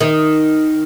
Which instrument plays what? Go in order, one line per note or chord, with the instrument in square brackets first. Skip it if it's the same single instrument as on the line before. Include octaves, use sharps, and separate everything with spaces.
[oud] D#3